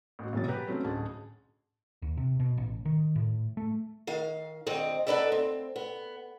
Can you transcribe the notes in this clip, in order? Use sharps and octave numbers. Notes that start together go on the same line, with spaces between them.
A1 F#4
E1 C3 E3 F#3 A6
G4 B4 F#5 G5 A#5
F#3 A3 C4 C#4 D#4
A1 D2 G#4 A5
D#2
C3
B2
A1
D#3
A2
A3
D#3 F5
D2 G#2 D#3 C4 D#5
B3 D#4 A4 B4 D5 E5
C4
B3